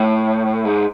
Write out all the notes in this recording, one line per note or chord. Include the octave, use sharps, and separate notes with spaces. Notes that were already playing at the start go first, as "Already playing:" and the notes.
Already playing: A2
G#2